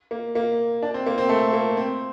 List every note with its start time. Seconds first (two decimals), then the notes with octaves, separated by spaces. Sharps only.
0.11 A#3
0.35 A#3
0.82 D4
0.94 C4
1.06 A#3
1.18 C4
1.29 A3
1.53 A#3
1.77 C4